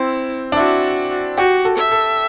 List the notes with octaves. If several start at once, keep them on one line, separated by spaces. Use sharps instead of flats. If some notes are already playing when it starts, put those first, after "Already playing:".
Already playing: C4 E4
D4
E4 F#4
F#4 G4
A4
E5
A4